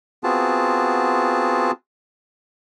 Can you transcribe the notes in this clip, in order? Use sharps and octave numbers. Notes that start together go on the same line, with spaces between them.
B3 C4 F4 F#4 G#4 A5